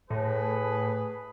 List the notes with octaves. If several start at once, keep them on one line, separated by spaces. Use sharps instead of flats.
A2 G#4 B4